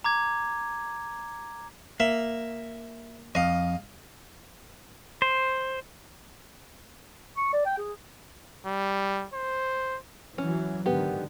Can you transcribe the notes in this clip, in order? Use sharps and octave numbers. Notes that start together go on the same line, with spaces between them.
A#5 D6 G#6
A#3 E5
F2 D#5 F5
C5
C#6
D5
G5
G#4
G3
C5
E3 F#3 C#4
G#2 D3 D#3 B3 G4